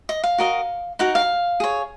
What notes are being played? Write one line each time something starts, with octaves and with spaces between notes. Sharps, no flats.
D#5
F5
F#4 A#4 D#5
D#4 F#4 A#4 F#5
F5
G#4 C#5